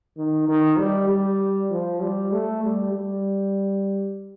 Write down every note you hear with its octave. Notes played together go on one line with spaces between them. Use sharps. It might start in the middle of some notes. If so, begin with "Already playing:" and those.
D#3
D#3
G3
G3
F3
G3
A3
G3
G3